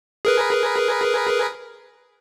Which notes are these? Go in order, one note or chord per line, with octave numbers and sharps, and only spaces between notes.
G#4 A#4 B4